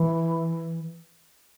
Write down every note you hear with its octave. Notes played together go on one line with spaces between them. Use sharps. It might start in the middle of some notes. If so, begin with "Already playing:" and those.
Already playing: E3